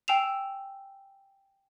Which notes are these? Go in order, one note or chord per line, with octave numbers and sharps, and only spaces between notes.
G5 G#5 E6 C7 E7 F7